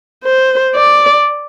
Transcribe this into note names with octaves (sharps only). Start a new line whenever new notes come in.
C5
D5